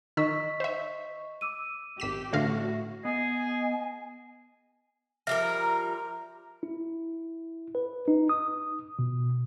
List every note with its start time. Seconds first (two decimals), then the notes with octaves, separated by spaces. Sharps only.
0.17 D#3 D#5 C#6 E6 B6
0.60 C5 E5
1.41 D6 E6 D#7
2.00 G#1 G4 B6 E7
2.33 A1 A2 D3 F#4 E5 F5 A#6
3.05 B3 G#4 D#5 G#5
5.27 F3 G3 A#4 E5 F6 A#6
5.40 A#5
6.63 E4
7.75 B4
8.08 D#4
8.29 D#6
8.99 B2